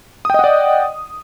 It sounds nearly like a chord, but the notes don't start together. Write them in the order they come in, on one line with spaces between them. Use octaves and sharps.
D#6 G5 D#5 F#5 D5